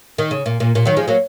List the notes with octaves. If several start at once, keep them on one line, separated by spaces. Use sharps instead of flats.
D#3
C#3
A#2
A#2
A#2
D#3 F#3
F3 G#3
F#3 A#3